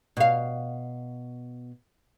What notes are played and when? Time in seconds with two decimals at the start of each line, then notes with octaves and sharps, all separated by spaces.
0.17 B2 F5